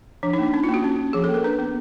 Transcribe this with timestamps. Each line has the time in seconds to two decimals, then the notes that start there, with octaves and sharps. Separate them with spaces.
0.23 F3 D4
0.33 D#4
0.39 A#3 D4
0.53 C#4 D#4
0.64 F4
0.69 A#3
0.74 F#4
0.84 C#4
0.99 C#4
1.13 F3 G#4
1.24 A4
1.29 A#3
1.34 A#4
1.44 D4 B4
1.59 B3